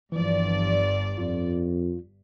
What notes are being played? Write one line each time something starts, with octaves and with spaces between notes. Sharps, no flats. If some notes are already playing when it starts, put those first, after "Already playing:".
G1 G2 E3 F3 D5
F2 F4